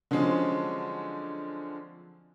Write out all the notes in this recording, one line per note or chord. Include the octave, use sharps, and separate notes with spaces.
D3 F3 F#3 G#3 C4 C#4